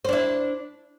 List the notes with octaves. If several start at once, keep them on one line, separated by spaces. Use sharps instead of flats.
D4 E4 C5